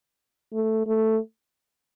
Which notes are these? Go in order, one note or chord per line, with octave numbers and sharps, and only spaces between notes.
A3
A3